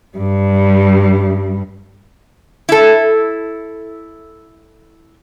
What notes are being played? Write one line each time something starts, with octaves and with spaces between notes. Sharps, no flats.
G2 G3
E4 A4